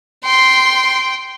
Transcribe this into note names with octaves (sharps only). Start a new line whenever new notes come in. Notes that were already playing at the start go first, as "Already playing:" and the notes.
G5 C6